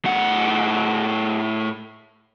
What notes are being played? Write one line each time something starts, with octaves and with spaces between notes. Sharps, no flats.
A2 F#5